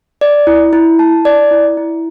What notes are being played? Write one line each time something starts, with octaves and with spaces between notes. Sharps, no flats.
D5
E4
E4
A5
D5
E4
E4